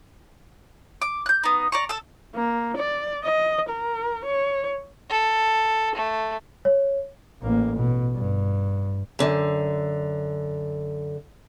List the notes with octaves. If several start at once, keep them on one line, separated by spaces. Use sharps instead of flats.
D6
F#6 G6
B3 D#4
D5 A#5 C#6
A4 E6
A#3
D5
D#5
A#4
C#5
A4
A3
C#5
A1 A#3
B2
G2
F#2 D3